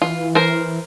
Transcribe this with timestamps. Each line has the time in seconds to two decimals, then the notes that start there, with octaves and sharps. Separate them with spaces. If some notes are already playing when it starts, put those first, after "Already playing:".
0.02 E3 F4
0.35 A#4 C5